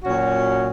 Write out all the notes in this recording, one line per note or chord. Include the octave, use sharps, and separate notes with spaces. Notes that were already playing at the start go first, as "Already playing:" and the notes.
A#2 F#3 C#4 F#4